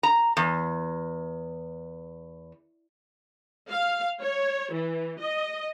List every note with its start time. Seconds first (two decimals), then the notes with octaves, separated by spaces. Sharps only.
0.03 A#5
0.37 E2
3.70 F5
4.21 C#5
4.72 E3
5.20 D#5